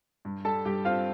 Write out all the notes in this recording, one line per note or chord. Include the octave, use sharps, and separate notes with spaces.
G2
G3 A4 A5
G2 G4 G5
C4 F4 F5